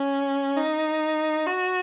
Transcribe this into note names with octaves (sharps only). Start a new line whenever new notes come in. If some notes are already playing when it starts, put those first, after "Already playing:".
Already playing: C#4
D#4
F#4